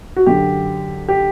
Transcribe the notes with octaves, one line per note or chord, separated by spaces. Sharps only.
F#4
F#2 D3 G4
G4